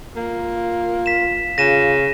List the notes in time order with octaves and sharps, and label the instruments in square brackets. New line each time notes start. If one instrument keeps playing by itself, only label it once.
[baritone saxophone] A#3 [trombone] F4
[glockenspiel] B6 E7
[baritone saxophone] C#3 [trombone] F4 [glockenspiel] A#6 D#7 E7